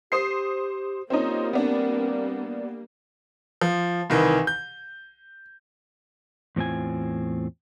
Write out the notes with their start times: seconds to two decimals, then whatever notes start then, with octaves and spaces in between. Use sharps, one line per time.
0.12 G4 C5 D#6 C7
1.10 G3 A#3 C4 C#4 D#4 F4
1.53 B3 C4 D4
3.61 F3
4.10 C2 D#3 E3
4.47 G6
6.56 E2 A2 C4 F4 G#5